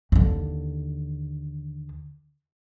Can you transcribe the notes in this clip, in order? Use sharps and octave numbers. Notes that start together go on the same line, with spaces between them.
D#2 D3